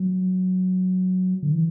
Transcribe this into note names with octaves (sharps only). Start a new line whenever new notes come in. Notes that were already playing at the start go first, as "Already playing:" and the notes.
Already playing: F#3
D3
E3